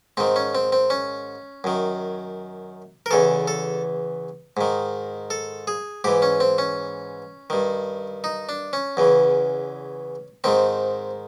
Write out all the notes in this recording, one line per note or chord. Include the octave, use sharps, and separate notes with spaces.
G#2 D#3 C4
C#4
C4
C4
C#4
F#2 D#3
A#4
E2 C#3 E3 A4
A4
G#2 D#3
A4
G#4
G#2 E3 G4
C#4
C4
C#4
G2 D#3
D#4
D4
C#4
E2 C#3 E3
G#2 D#3 C4